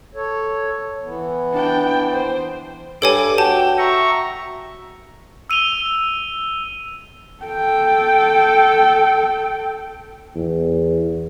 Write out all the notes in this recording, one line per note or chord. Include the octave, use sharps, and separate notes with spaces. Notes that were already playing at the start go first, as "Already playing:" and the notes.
A4 C#5
E3 B3
D4 G5
C5
G2 A4 C#5 G#5 D6
F#4 G5 A5
E5 A#5 C#6
E6 D#7 F7 G7
A4 G5
E2